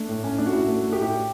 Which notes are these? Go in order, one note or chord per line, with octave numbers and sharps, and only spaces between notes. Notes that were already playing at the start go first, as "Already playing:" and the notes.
Already playing: A3 D4
A2
A2 C#4
A3 D4
F#4
A2 E4
A3
A3
G4
A2
G4